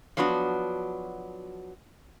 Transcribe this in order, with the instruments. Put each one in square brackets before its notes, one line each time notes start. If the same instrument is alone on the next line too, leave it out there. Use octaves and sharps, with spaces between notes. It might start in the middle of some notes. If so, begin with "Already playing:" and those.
[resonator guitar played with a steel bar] F3 F#3 B3 D4 F#4